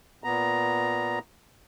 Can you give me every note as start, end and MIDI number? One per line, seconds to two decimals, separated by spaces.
0.24 1.19 46
0.24 1.19 59
0.24 1.19 82